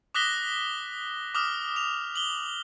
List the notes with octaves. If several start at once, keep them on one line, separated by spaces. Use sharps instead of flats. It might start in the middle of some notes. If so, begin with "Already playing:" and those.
D6 D#6 F#6 A#6 B6 G7
D6 D#6 F6
F7
F#7 G7